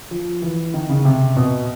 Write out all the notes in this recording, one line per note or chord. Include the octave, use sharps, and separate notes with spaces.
F3
E3
D#3
C#3
C3
B2